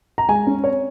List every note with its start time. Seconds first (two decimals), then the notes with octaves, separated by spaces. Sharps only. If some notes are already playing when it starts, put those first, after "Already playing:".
0.18 A#5
0.28 G#3 G#5
0.47 C#4
0.64 C4 C#5